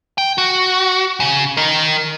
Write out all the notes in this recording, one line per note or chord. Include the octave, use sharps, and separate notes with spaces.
G5
F#4
C#3
A#4 D#5